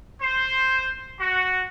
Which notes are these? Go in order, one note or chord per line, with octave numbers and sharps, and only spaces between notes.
C5
F#4